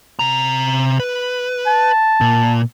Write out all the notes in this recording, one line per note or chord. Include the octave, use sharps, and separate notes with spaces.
C3 A#5
B4
A5
A#2